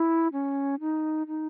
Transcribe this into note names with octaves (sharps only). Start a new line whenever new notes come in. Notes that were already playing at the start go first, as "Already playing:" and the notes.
Already playing: E4
C#4
D#4
D#4